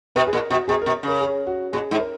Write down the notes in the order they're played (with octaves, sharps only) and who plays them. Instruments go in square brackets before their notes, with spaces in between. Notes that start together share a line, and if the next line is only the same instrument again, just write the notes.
[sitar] B2 [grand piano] B4
[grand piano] G#4
[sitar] A#2 [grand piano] A#4
[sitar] B2 [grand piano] F#4
[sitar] B2 [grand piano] G#4
[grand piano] A#4
[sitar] B2
[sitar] C#3 [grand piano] A#4
[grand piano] G#4
F#4
[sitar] A#2 [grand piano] G#4
[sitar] G#2
[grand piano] A#4